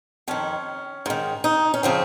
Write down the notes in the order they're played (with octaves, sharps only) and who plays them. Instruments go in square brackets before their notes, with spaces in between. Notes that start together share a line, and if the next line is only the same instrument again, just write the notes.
[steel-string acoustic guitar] F2 D#3 C#4
G#2 D#3
D#4
C#4
C#3 F3 C4